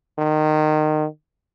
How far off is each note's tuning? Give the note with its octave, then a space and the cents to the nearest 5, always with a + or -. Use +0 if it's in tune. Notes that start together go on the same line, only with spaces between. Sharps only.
D#3 -20